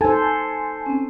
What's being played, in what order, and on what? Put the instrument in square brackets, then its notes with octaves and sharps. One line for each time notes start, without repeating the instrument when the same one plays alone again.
[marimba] D#4 [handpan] A4 C5 [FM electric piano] G#5 A5
[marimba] C4 C#4